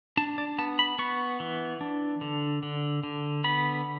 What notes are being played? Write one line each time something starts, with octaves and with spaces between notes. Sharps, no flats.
D4 A5
D5
B3 A5
B5
B3 C#6
E3
D4
D3
D3
D3
B3 B5